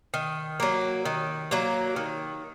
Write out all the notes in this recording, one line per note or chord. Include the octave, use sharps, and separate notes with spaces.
D#3
F#3 A#3
D#3
F#3 A#3
D#3